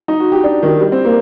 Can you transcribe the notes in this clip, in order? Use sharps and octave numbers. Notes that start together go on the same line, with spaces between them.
D#4
F#4
G4
D4
D#3
G3
C4
A#3